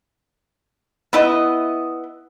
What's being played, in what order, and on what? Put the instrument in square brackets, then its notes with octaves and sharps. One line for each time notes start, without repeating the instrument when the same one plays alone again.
[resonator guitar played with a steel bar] B3 E4 D#5